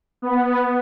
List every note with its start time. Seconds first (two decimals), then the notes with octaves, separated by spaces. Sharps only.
0.22 B3